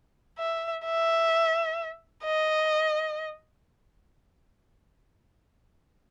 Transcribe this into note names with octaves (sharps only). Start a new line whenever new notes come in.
E5
E5
D#5